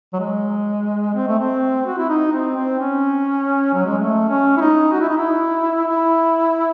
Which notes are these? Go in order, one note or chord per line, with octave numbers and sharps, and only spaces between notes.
F#3
G#3
C4
A3
C4
F#4
E4
D#4
C4
C4
C#4
F#3
G#3
A3
C#4
E4
D#4
F#4
E4
D#4
E4
E4